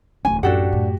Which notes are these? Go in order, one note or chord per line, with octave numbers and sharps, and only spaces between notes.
D1 E2 A3 C#4 G#5
A1 F#2 D4 F#4 G4 A4 F#5
A2